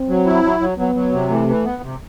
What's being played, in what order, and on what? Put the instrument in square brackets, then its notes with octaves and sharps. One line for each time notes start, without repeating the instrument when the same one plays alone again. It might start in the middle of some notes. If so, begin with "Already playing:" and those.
Already playing: [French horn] C4
[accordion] F#3
E4
F#3
F#3
[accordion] F#3 [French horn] B3
[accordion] F#3
C3
[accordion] E3 [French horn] A3
[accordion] E3
B3
C3